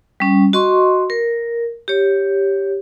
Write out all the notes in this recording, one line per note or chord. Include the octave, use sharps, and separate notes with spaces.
G3 C#4
F#4 D#5 C6 C#6
A#4
G4 C#5